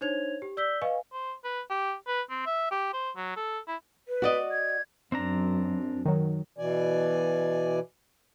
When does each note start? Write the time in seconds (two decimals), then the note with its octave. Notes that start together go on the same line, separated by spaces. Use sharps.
0.01 D4 D#4 C5 C#5 G#6 F7
0.42 G4
0.57 D5 E6 G6 B6 G7
0.82 B4 D#5 F5 G#5 C#6
1.13 C5
1.44 B4
1.70 G4
2.08 B4
2.30 C4
2.46 E5
2.71 G4
2.93 C5
3.17 F#3
3.36 A4
3.68 E4
4.08 B4
4.22 F#4 D5 D#5
4.52 G#6
5.12 F#2 C4 D4 A#5
6.06 D#3 F#3
6.58 B2 E3 D5 G#5